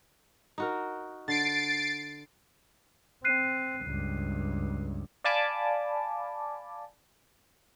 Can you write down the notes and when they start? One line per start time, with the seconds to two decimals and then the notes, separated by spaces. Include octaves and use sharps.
0.58 D#4 F#4 A#4
1.28 D3 A6 C7 D7
3.24 C4 F#6 C7 D#7
3.83 C#2 G2
5.24 D5 F5 G#5 A5 B5 D6